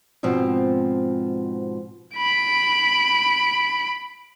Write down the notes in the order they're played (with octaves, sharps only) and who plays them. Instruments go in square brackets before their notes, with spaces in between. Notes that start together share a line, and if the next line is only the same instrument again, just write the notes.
[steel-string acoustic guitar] G#2 B2 F3 C4
[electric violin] B5 D7